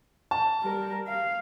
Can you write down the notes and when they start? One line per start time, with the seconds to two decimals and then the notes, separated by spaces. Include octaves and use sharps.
0.31 A5
0.62 G3 A#4
1.07 F5